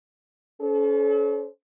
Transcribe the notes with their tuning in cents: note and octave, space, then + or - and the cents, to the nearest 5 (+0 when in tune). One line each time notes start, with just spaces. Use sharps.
C#4 +25 A4 -40 C5 +0